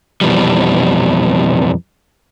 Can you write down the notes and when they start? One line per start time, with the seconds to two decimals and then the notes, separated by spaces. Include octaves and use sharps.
0.21 F2 B2 E3 G3